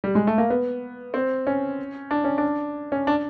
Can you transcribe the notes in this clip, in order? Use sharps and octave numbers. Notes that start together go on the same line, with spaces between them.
G3
G#3
A3
A#3
B3
C4
C#4
D4
C#4
D4
C#4
D4